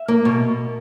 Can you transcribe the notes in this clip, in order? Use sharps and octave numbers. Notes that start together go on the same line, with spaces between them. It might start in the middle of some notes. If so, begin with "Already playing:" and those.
Already playing: E5
A#3
B2